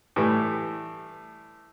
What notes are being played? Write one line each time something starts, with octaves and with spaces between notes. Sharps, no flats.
A2 E3 G3 A3